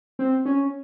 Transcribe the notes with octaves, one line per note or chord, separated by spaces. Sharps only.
C4
C#4